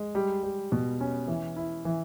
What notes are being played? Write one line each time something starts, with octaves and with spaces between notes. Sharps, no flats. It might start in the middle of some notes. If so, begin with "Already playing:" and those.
Already playing: G#3
G3
G3
B2
C#4
E3
E4
E3